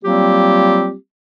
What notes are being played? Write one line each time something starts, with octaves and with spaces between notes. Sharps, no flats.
F#3 G3 A#3 C4 F4 G4